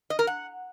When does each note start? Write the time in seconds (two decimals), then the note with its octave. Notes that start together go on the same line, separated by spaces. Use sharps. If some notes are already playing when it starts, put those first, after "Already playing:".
0.10 D#5
0.19 A#4
0.27 F#5